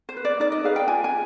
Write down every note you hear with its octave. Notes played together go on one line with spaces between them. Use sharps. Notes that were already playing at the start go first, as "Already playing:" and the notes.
C5
B4
D5
D#4 D5
D#5
G#4 B4 F5
G5
F4 G#5
G#5